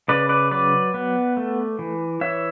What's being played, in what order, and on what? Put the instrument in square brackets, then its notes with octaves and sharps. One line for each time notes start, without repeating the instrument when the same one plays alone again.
[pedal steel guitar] C#3 B4 D5
B4 D5
F#3 B4 D5
B3
A3
E3
E3 C#5 E5